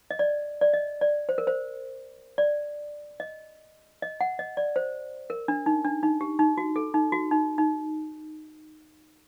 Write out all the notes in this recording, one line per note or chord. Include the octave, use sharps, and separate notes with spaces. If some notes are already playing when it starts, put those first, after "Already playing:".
D#5
D5
D5
D#5
D5
C5
A#4
C5
D5
D#5
D#5
F#5
D#5
D5
C5
A#4
D4
D#4
D4
D#4
G4
D#4
F#4
A4
D#4
F#4
D#4
D#4